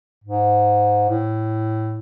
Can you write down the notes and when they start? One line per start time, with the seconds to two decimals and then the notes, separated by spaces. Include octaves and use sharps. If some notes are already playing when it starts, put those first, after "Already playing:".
0.24 G#2
1.09 A2